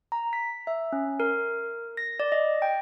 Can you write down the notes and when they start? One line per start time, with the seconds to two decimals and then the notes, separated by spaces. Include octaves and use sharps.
0.12 A#5
0.33 B6
0.67 E5
0.92 C#4
1.20 A#4
1.97 A#6
2.20 D5
2.32 D#5
2.62 G5